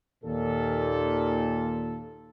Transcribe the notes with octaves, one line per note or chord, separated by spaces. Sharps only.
D#2 A#2 A4